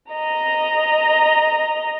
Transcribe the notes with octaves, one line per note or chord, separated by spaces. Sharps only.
D#5 A#5